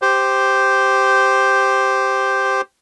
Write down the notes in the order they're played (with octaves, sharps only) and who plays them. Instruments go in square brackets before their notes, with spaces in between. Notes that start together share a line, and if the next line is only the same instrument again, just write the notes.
[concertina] G4 C5